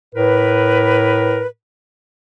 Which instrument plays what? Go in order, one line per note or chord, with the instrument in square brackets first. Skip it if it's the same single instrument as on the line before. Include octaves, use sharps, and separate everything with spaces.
[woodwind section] A2 A#4 B4